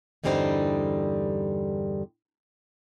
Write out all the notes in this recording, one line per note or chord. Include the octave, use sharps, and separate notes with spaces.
E2 G2 D3 G3 C4 D#4